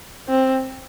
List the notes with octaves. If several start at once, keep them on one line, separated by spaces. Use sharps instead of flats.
C4